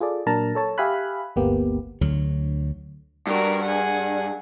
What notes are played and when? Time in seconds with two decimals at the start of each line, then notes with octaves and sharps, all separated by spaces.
0.01 F4 G#4 A4 D5
0.26 A#2 F#3 D4 A#4 A5 A#5
0.55 A4 C#5 A5
0.78 G4 E5 F5 G#5 B5 F#6
1.36 G1 D2 A#3 B3 G4
2.01 D2 D3 F#3
3.27 G2 F#4 A#4
3.62 G#4 F#5